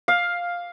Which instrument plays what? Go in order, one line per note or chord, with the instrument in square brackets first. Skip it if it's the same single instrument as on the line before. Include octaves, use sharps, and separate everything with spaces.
[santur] F5